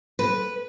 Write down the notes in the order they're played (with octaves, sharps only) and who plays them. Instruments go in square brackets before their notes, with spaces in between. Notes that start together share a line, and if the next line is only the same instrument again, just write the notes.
[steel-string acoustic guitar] B4